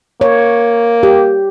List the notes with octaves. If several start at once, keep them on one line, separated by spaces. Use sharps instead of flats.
A#3 C#5
G4